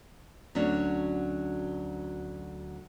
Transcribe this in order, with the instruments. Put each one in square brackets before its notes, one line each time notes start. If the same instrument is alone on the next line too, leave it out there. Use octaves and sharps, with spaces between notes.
[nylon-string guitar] D2 F#3 C#4 D4